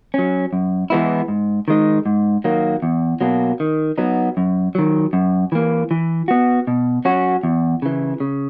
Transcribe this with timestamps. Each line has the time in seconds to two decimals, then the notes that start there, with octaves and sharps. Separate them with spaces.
0.14 F#3 C#4
0.53 F#2
0.90 E3 G#3 B3 E4
1.28 G#2
1.68 D#3 G#3 D#4
2.06 G#2
2.44 D#3 F#3 A#3
2.82 E2
3.21 B2 F#3 A#3
3.60 D#3
3.98 F#3 B3 D#4
4.37 F#2
4.75 D#3 F#3
5.13 F#2
5.52 E3 A#3
5.91 E3
6.28 B3 F#4
6.67 B2
7.05 F#3 C#4 F#4
7.43 E2
7.82 C#3 E3
8.20 C#3